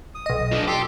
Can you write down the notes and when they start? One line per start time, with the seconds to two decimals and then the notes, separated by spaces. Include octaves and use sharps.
0.15 D#6
0.26 B1 D#5
0.52 F3 D4
0.67 G4 A4 C6 D6